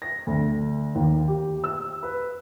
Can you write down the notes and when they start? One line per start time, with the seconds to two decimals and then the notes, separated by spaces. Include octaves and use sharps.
0.02 A#6
0.27 D2
0.95 D#2
1.28 G4
1.64 E6
2.03 B4